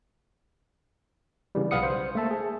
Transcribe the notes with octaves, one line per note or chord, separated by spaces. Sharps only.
C#3 E3 G3
B1 B4 F5 F#5 D#6 C#7
C5
A3 A#3 E5 A5
G#4